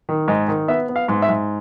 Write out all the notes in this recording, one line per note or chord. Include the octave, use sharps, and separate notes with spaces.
D#3
G#2 D#5
D#3
B3 E5
B3
F5
G#2
E5
G#2